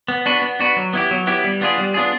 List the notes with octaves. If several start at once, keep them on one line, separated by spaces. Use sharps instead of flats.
B3
D4 F#4 B4
B3
D4 F#4 B4
F#3
B3 E4 G4
F#3
B3 E4 G4
G3
B3 D4 F4 G#4
G3
B3 D4 F4 G#4